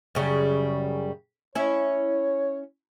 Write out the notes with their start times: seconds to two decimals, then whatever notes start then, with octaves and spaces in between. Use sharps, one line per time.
0.15 F#2 C#3 G3
1.55 C#4 E4 C#5